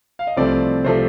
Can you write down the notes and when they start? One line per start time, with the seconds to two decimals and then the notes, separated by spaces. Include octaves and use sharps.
0.19 F5
0.27 D#5
0.36 C2 C3 F3 A3 C4 D5
0.84 C3 F3 A3 C4 C5